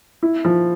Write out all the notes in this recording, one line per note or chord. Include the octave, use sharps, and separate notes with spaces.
E4
F3